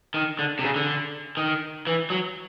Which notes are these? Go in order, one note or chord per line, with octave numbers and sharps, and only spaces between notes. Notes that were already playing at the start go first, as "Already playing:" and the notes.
D#3
D3
C3
C#3
D3
D#3
E3
F#3